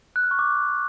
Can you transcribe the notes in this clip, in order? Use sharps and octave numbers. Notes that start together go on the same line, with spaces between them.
F#6
F6
C#6
D6